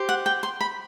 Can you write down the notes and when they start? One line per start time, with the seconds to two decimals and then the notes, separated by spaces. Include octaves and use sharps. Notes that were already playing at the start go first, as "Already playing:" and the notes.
Already playing: G4 C5
0.09 F#5
0.26 G5
0.43 C6
0.61 B5